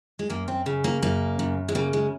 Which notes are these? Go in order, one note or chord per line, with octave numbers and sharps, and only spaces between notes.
G#3
F#2 A#3
C4
C#3
A#3
F#2 A#3
F#2
G#3
C#3 A#3
G#3